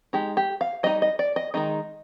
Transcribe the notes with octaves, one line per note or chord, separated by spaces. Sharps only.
G#3 D#4 G4
G4
F5
G3 C4 D#4 D#5
D#5
D5
D#5
D#3 G#3 D#4 D#5